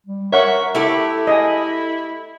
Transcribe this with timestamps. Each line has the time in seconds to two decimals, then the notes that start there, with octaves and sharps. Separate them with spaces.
0.07 G3
0.32 A#4 C#5 E5 F#5 C#6
0.75 A3 E4 G4 A4
1.27 D#5 G#5